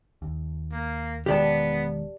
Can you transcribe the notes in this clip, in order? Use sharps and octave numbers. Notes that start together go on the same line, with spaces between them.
D#2
A#3
E1 D#3 G#3 B3 G4 D5 A5